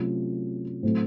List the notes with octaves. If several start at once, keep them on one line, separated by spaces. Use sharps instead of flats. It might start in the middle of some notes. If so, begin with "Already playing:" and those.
Already playing: C3 F#3 A3 C#4 F4
A2 F#3 A3 C4